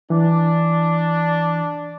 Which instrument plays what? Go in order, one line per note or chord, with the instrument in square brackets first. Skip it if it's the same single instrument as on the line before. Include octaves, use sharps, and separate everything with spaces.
[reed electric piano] E3 [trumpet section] D4